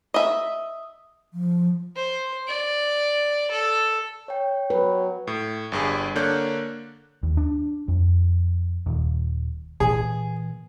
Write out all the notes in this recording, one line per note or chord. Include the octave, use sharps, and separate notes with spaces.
D#5 E5
F3
C5
D5
A4
C#5 G5
F#3 B4
A2
G1 G2 G#4
D3 A#3 D4 C#5 F#6 G6
D#2
D4
F2
D#1
A#2 E3 G#4